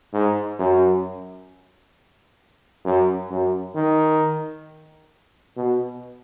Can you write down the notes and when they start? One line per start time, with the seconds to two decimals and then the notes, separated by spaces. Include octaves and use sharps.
0.13 G#2
0.59 F#2
2.85 F#2
3.30 F#2
3.75 D#3
5.57 B2